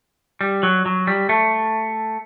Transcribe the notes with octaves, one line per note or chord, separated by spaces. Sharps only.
G3
F#3
F#3
G3
A3